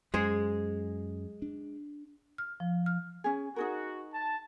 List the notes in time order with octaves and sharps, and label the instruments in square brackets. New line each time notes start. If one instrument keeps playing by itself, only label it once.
[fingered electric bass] F#2 [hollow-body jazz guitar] G#3 G#4 C5
[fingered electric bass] D4
[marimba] F6
F3
F6
[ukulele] C#4 G#4
[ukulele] D#4 G#4 A#4 [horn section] F#4
[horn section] A5